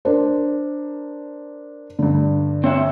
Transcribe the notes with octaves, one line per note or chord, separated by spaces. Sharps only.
D4 A#4 C5
G2 D3
C4 C#5 E5